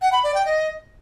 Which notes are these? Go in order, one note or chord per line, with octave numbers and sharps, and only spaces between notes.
F#5
B5
D5
G5
D#5